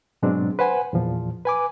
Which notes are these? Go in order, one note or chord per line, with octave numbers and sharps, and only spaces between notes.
G#2 B2 F#3 G#3 C4 D4
B4 C5 F#5 G#5
E2 A#2 F3
B4 G#5 D6